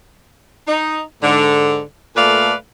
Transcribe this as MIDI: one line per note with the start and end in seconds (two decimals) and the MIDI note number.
0.68 1.01 63
1.22 1.81 44
1.22 1.81 50
2.16 2.54 46
2.16 2.54 57
2.16 2.54 69
2.16 2.54 71
2.16 2.54 74
2.16 2.54 77